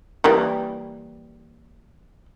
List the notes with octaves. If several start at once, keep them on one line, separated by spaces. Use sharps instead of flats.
E3 G3 A#3